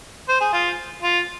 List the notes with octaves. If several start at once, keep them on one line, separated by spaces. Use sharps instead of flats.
C5
G#4
F4
F4